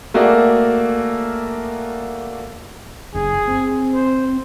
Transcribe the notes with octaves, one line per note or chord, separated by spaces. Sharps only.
A3 A#3 F#4 G#4 A#4 D5
F#1 G#4
C4
C5